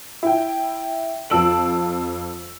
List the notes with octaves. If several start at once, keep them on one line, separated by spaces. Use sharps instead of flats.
E4 G5
F2 F4 A5 E6 D7 F#7